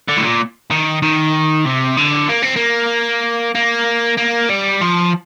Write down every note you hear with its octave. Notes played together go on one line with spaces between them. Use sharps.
D3
A2
A#2
D#3
D#3
C3
D3
A#3
C4
A#3
A#3
A#3
G3
F3